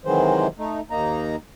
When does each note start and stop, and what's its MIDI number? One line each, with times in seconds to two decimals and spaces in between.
0.05 0.47 48
0.05 0.47 51
0.05 0.47 52
0.05 0.47 54
0.05 0.47 56
0.05 0.47 72
0.58 0.81 57
0.58 0.81 63
0.90 1.36 39
0.90 1.36 58
0.90 1.36 63
0.90 1.36 82